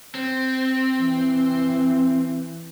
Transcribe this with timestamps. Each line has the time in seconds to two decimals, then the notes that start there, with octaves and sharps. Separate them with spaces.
0.15 C4
1.00 E3